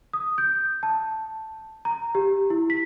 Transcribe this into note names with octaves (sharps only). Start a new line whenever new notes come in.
D#6
G6
A5
A#5
G4
E4
B6